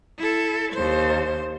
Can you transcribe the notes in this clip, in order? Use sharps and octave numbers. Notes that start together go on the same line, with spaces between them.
E4 A4
D#2 C5